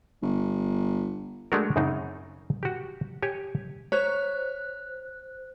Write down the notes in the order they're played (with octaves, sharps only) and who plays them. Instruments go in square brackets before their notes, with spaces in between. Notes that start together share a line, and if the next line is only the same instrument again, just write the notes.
[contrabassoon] G1
[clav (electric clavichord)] G#3 A3 D4 F#4 A#4
F#2 C#3 C4 D#4
F#4 G4
G4 C#5 G#5
[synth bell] C5 F#6 [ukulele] C#5